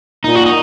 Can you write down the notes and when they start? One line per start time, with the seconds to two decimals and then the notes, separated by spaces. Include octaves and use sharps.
0.24 A#2 D#4
0.35 F#4
0.46 D#4